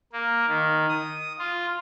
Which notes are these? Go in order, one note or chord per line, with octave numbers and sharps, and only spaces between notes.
A#3
D#3
D#6
F4